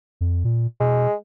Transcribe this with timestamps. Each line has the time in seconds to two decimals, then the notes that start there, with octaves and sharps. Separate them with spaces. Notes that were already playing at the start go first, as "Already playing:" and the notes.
0.21 F2
0.44 A#2
0.80 B2 G#3